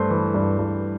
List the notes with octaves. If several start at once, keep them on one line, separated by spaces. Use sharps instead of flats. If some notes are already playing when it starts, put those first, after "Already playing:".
Already playing: G2 A3 C5
E3
G2
G2